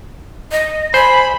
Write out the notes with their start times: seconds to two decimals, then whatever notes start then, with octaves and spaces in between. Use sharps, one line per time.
0.52 D#5
0.94 C5 G#5 B5